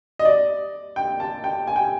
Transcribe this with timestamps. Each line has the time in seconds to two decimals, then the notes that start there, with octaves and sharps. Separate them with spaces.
0.19 D#5
0.25 D5
0.96 G5
1.20 A5
1.44 G5
1.67 G#5
1.76 G5
1.84 G#5